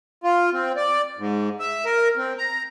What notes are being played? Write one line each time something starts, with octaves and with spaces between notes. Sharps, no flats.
F4
C4
D5
G#2
E5
A#4
C4
A#5